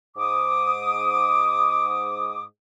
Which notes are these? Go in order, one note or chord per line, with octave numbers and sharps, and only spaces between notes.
G#2 D6 D#6